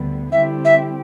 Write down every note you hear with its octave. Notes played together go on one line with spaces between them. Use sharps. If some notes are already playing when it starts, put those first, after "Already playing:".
Already playing: D2 D3 G3 B3
D3 G3 C4 E4 G4 E5
E5